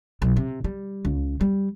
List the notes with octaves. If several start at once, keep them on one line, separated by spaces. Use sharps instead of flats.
B1
C3
G3
C#2
G3